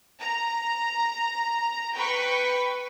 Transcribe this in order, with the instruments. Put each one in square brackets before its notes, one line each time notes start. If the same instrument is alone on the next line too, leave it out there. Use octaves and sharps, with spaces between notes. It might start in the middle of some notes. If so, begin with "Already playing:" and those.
[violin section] A#5
B4 G5 C#6 B6